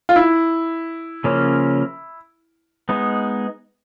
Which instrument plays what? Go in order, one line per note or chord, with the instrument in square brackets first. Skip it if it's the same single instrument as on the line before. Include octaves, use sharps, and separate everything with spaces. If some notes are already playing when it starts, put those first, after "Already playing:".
[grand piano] F4
E4
[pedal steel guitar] C#3 F3 A#3 C#4
G#3 B3 D#4